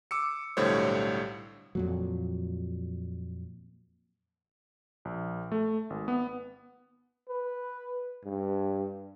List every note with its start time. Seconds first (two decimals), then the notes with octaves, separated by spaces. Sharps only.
0.11 D6 E6 C#7
0.57 B1 A2 D3 G3 C5 C#5
1.75 F2 A#2 F#3
5.05 A#1
5.52 A3
5.90 G#1
6.08 B3
7.29 B4
8.24 G2